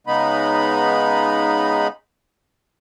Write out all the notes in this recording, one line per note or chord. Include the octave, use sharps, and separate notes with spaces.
C#3 G#3 B3 D#4 B5